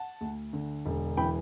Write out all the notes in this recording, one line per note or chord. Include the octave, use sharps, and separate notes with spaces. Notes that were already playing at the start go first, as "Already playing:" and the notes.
Already playing: F#5 A5
D2
D3
E1
E3 G5 B5